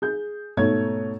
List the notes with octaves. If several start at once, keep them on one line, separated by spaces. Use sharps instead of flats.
G#4 G6
G#2 B2 A3 C#5 G#6